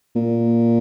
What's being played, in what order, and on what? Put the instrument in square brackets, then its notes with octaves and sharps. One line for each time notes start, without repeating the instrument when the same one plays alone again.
[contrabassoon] A#2